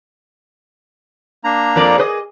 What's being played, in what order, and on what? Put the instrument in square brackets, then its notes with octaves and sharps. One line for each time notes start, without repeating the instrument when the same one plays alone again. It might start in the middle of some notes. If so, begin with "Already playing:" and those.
[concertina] A#3 D4 A#5
[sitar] F2 A#4 D5
G#4 B4 D#5